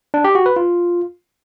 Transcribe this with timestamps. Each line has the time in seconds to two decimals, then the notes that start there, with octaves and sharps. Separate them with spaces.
0.14 D4
0.24 G4
0.35 F#4
0.46 B4
0.56 F4